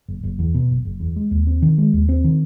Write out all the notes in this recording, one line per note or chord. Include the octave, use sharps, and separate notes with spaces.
F#1
F#1
E2
B2
F#1
F#1
E2
G#3
D#2
C4
D#3
G#3
D#2
C4
D#3